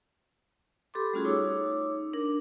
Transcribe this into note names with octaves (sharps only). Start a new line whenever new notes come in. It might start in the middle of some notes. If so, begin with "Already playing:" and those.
G4 A4 B5 C6 D6
G3 A3 C#4 F4 F#4 G#4
D#4 C#5 D6 E6
D4 A#4